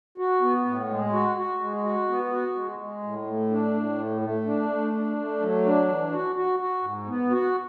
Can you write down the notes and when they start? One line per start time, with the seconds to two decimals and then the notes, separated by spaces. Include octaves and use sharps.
0.18 F#4
0.41 B3
0.65 A2
0.89 G#3
1.13 F#4
1.37 F#4
1.60 G#3
1.84 F#4
2.08 B3
2.32 F#4
2.55 G#3
2.79 G#3
3.03 A2
3.26 A3
3.50 D4
3.74 A2
3.98 A3
4.21 A3
4.46 D4
4.69 A3
4.93 D4
5.17 A3
5.40 F#3
5.64 D4
5.88 E3
6.12 F#4
6.36 F#4
6.60 F#4
6.83 G#2
7.07 B3
7.30 F#4